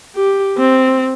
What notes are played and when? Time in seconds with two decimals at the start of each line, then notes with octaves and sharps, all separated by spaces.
0.16 G4
0.58 C4